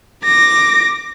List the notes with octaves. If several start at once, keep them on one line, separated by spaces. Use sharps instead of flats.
D6 A#6